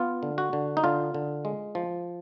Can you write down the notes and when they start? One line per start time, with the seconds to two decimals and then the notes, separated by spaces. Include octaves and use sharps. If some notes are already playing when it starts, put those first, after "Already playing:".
Already playing: B3 F4
0.23 D3
0.38 F#4
0.53 D3
0.77 D#4
0.84 D3 F4
1.14 D3
1.45 G#3
1.75 F3